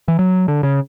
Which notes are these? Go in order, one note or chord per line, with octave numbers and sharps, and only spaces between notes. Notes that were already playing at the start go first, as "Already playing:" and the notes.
E3
F#3
D3
C#3